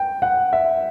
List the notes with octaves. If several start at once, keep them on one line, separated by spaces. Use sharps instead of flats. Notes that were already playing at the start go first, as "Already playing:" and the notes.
Already playing: G5
F#5
E5